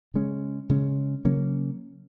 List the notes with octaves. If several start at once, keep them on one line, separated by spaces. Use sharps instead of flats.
C#3 G#3 C#4
C#3 G#3 C#4
C#3 F#3 A#3 C#4